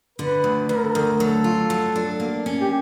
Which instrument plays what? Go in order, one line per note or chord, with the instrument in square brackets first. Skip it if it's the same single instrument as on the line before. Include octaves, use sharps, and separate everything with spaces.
[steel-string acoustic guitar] D3 [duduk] B4
[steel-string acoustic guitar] D2
[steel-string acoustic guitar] D2 [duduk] B4
[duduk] A#4
A4
[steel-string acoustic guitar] D2 [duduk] A#4
[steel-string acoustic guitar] F#3 [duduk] A4
[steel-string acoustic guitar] F4
F#3
D4
A#3
C#4
[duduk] G4